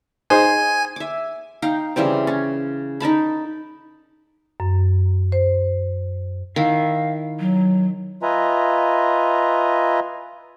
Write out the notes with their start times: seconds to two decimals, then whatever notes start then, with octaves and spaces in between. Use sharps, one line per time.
0.30 D#4 G#4 C5 G#5
0.96 E5 D6
1.62 D#4 F5 G5
1.96 C#3 E3 G3 C4
2.27 C#4
3.00 D#4 A#4 A5 B5
4.60 F#2
5.32 C5
6.56 D#3 E4 F5
7.40 F#3
8.23 F4 B4 D#5 E5 G#5 A#5